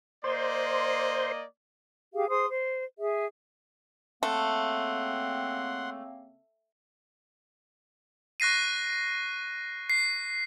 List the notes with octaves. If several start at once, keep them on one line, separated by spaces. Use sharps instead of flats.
A#3 C5 D5 D#5 C6
G4 G#4 F5
G#4 C5 C6 D#6
C5
G#4 E5
C#3 A3 A#3 C4 F#5 C6
C#6 F#6 A#6 C7 D#7
C7